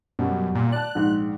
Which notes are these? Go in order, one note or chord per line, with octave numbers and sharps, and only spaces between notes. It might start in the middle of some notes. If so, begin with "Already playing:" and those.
F#2 B2 G3
A#2
D5 A5 F#6
A#1 G#2